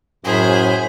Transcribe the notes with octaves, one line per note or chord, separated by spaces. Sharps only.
F#2 A2 G#4 C5 B5